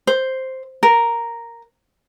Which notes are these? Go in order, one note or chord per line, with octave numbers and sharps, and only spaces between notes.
C5
A#4